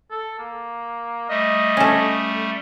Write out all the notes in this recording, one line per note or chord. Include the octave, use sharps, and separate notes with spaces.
A4
A#3
G3 A3 D#5
C#4 A4